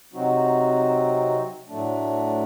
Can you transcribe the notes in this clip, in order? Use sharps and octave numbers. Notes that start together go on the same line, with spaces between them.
C3 F#3 C4 D#4 F#4
A2 F#3 A3 D4